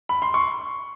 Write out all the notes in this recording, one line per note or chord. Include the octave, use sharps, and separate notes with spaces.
B5
C6
C#6